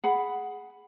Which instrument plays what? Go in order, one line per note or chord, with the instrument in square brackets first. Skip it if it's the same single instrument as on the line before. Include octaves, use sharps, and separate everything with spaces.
[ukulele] G#4 F#5 B5